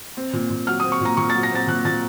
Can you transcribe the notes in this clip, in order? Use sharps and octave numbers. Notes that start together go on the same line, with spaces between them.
C4
A#2
A#2
F#3 F6
D#6
C4
C#6
A#2 A#5
A#2 C#6
A6
F#3
A#6
C4 A6
A#2 F#6
A#2 A6